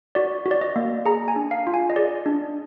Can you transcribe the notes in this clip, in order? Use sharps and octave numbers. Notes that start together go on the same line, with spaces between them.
F#4 D5
F#4
D5
D#5
A#3
G#4 A#5
G#5
D4
F5
F4
G#5
D#5
G#4 D5
D4